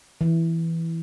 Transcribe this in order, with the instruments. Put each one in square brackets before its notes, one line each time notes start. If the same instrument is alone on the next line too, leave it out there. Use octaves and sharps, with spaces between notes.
[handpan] E3